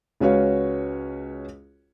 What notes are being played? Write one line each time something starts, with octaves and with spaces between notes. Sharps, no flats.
C#2 C#4 F#4 B4 C#5 F5